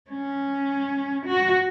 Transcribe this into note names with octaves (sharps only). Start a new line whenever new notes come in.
C#4
F#4